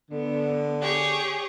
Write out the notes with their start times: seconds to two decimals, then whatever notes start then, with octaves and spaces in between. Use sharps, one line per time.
0.11 D3 B3
0.81 G4 G#4 C#5